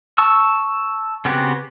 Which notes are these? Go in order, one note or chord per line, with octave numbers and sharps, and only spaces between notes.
A5 C#6 E6
C#3 B3 C4 F#4 G4